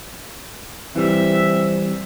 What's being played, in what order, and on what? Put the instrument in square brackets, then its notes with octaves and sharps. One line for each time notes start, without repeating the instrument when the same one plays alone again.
[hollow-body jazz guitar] E3 G3 [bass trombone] C4 [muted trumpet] E5